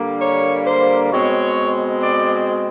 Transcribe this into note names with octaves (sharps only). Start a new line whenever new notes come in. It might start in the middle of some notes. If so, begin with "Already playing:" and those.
Already playing: D3 G3 A#3
C#5
C5
B2 G#3 C4 C#5
D5